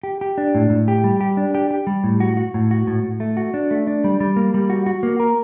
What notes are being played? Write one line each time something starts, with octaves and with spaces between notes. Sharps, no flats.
G4
G4
D4
A2
A2
G4
G3
G4
D4
G4
G4
G3
A2
F#4
F#4
A2
F#4
A2
A2
A3
F#4
D4
A3
D4
G3
G3
A#3
G3
F#4
F#4
A#3
A#4